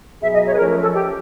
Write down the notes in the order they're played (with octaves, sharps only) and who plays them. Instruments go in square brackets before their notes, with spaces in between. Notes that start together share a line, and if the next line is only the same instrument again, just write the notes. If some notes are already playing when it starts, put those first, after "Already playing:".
[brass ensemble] B2 F#3 B3 D#4 G#4 [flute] E5
[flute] D#5
C#5
B4
[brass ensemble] F3 A3 C#4 [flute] A#4
[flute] A4
G4